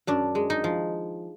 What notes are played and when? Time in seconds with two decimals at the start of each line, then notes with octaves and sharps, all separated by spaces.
0.07 F#2 D4
0.35 G#3
0.50 D#4
0.64 F3